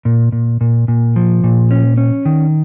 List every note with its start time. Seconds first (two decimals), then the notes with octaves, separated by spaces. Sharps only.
0.05 A#2
0.32 A#2
0.61 A#2
0.88 A#2
1.16 F3
1.44 A#2
1.71 C#4
1.97 C#4
2.25 D#3